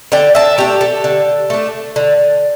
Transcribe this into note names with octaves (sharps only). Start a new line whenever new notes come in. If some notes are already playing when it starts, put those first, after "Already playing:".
D3 D5 G5
E5 A5
A3 D4 G4
A4
D3
A3 D4
D3